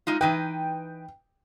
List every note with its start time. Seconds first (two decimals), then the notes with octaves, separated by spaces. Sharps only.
0.07 G#3 D#4 F4
0.21 E3 D#4 B4 G5